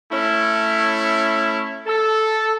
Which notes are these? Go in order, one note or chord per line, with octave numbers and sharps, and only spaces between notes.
A3 C#4 E4
A4